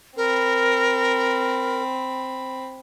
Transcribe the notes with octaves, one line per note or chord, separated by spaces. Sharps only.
C4 A#4 B5